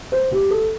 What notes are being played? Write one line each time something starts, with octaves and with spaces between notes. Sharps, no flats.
C5
G4
A4